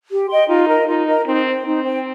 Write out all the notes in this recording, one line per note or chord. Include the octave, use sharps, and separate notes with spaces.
G4
D#5 G5 C6
D#4 F4
A#4 D#5 A#5
D#4 F4
A#4 D#5 A#5
C4 D#4
C5 G5
C4 D#4
C5 G5